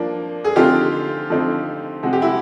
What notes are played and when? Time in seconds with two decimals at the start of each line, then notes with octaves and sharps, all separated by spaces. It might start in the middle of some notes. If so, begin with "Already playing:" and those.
Already playing: F3 A#3 D4
0.44 G#4
0.56 D3 F3 A3 C4 D#4 F4 G4
1.30 D3 F3 A3 C4 D#4
2.03 C3 F3 G#3 F#4
2.13 G4
2.22 E4 F#4